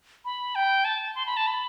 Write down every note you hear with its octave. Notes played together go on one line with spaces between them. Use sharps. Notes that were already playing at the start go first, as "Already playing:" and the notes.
B5
G5
A5
C6
B5
A5
B5